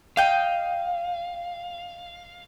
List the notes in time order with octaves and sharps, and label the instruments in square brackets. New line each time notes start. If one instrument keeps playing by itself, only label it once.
[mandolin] D#5 G5 [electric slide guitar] F5